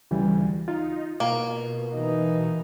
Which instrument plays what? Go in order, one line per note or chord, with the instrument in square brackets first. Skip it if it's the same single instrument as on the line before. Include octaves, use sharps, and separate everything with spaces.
[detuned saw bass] D2 [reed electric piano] C#3 E3 G3
[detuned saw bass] D#4 [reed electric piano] F4
[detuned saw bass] B2 [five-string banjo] A#3
[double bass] E3 D#4